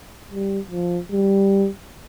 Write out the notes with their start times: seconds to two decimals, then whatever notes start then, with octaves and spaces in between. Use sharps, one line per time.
0.31 G3
0.71 F3
1.12 G3